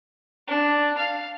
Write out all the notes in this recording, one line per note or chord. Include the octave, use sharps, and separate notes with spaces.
D4
F5